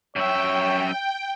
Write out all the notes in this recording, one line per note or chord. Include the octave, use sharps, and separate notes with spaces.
F#2 C#5 E5 G5